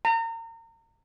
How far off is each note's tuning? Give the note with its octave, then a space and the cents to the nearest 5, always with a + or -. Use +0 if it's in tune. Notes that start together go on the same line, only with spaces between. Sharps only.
A#5 -35